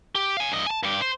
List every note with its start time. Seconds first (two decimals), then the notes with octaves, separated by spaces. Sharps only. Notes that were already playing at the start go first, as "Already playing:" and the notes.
0.15 G4
0.37 F5 G#5
0.51 G2 D#5
0.66 G#5 A5
0.83 G2 G4
1.02 C5